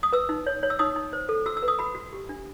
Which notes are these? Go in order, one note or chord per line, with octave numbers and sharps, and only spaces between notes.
D#6
B4 E6
D#4
C#5
C#5
E6
D#4 D#6
D#4
C5
A4
F#4 E6
E6
B4
D#6
F#4 B5
F#4
G4
D4